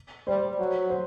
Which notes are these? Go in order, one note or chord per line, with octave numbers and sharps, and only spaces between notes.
G3 C5
F#3
C5